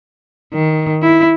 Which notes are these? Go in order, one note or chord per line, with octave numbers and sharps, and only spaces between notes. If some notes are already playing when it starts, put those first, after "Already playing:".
D#3
E4